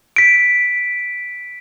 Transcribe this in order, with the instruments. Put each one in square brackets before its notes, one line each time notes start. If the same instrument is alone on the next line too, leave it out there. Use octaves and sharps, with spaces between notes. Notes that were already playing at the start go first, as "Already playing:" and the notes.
[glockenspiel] B6 D7